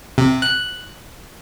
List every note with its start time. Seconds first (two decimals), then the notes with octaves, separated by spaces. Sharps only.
0.18 C3
0.42 F#6